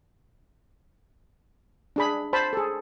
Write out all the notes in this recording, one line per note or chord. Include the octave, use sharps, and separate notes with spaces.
D4 G#4 B5
C5 A5 B5
G#4 A4